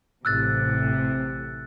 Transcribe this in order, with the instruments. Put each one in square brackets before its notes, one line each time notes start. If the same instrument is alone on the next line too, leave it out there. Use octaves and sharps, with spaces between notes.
[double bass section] A1 A2 [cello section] C3 [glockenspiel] E6 F#6 A6